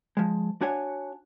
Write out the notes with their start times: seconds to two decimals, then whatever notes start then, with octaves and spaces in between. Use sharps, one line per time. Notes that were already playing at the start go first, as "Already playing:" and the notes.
0.17 F3 G#3
0.61 D4 F#4 C#5 G#5